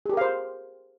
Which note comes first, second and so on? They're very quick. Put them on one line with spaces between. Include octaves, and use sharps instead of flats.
G#4 G4 A#4 F5 C5